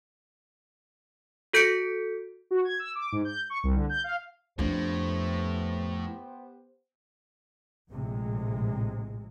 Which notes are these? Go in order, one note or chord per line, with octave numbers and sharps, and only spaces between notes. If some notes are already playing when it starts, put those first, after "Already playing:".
F#4 A4 G6 B6 C#7 D7
F#4
G#6
E6
D6
G#2
G6
C#6
C2
D3
G6
F5
F2 A2 B3 D4 G4 C5
A#1 A2 C3 G#3